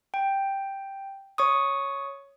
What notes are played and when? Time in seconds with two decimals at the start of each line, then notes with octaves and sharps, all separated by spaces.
0.14 G5
1.38 C#5 C#6 D#6